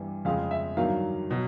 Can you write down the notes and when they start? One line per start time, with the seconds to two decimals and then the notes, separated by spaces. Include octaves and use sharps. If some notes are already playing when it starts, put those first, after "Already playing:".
Already playing: G2 E3 G3
0.25 F2 C#3 F3 G#3 F5
0.51 E5
0.77 G2 D#3 F#3 F5
1.31 B2 F#3